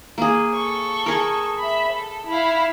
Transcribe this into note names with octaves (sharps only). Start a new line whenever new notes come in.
A#3 G#4
A4 C#6
G#4 A#4
E5 B5
A4
E4 F5